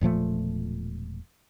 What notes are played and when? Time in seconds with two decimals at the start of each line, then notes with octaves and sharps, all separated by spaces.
0.01 E1 A#2 F3 A3